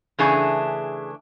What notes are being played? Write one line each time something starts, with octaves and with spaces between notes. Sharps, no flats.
C#3 E3 A3 D4 G#4